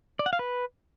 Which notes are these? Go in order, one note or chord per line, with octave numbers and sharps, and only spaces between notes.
D5
F#5
F5
B4